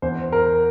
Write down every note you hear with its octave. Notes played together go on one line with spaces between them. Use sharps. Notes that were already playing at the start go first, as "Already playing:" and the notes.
E2 C5
A#4